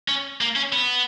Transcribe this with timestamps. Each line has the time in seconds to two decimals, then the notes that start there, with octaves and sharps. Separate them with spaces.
0.08 C#4
0.41 A#3
0.56 C#4
0.73 B3